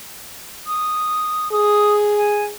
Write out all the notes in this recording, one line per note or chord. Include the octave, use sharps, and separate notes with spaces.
D#6
G#4 D#6
G#5